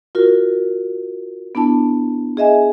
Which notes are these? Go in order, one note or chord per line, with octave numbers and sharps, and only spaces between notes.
F4 F#4 A#4
B3 D4 E4 A5
G#4 D#5 E5 G#5